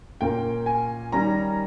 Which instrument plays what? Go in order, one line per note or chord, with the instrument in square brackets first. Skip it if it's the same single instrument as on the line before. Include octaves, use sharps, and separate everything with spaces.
[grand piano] A#2 A#3 C#4 G5
G#5
D#3 G3 C#4 A#5